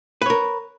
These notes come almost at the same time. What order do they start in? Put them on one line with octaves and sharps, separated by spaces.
B4 C#5 A#4